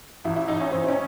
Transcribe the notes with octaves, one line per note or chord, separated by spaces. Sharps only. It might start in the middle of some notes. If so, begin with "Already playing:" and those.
A1 E4
E4
A1 D#4
C#4
A1 C4
C4
C#4